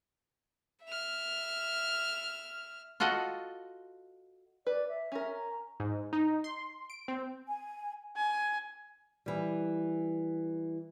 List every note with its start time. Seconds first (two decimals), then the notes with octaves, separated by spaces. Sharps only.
0.85 E5 F6
3.00 F4 F#4 A4 D#5 F#5
4.67 B4 D5
4.89 E5
5.12 C#4 A#4
5.32 A#5
5.80 G#2
6.13 D#4
6.44 C6
6.90 D7
7.08 C4
7.47 G#5
8.16 G#5
9.26 E3 G3